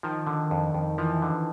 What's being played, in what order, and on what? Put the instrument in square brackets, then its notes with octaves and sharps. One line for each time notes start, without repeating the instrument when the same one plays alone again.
[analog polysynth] D#3 [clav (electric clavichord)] F3
[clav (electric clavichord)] D3
F2
F2
[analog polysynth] E3 [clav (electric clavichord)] F3
[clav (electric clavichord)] D3